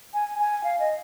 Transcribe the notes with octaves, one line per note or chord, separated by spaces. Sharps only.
G#5
G#5
F5
D#5